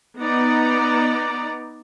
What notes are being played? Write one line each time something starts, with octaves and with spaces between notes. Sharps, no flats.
B3 D#4 D5 A#5